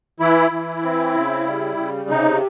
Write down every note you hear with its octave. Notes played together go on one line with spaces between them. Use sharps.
E3 E4
E3
C4
C#3
G3
C#3
C3 D#4